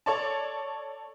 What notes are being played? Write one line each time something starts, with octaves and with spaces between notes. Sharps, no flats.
A4 C#5 D5 A5